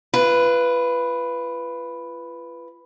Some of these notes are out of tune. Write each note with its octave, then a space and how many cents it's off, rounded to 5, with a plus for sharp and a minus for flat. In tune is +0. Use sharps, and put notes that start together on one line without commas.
F4 -35 B4 +0